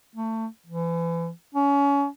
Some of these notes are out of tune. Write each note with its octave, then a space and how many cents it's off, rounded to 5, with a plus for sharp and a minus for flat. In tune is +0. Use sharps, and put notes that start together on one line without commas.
A3 +25
E3 +35
C#4 +25